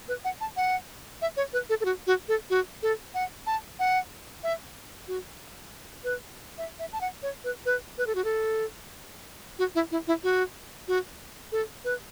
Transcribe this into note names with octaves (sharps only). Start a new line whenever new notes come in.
B4
F#5
A5
F#5
E5
C#5
B4
A4
A4
F#4
F#4
A4
F#4
A4
F#5
A5
F#5
E5
F#4
B4
E5
E5
A5
F#5
C#5
B4
B4
B4
A4
F#4
A4
F#4
E4
E4
E4
F#4
F#4
A4
B4